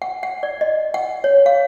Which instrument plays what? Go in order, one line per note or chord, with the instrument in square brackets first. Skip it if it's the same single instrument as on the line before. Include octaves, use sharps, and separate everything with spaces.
[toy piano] F#5
F#5
D5
D#5
F#5
C#5
F5